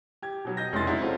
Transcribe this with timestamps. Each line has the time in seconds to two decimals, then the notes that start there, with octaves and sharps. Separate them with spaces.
0.22 G4 G#6
0.45 B2 F#3
0.57 D#5 G6 A#6
0.72 F1 G#3 C#4 E4 C6 A6
0.87 D#4 E4 F#4 C#5
1.01 C4 F4 A4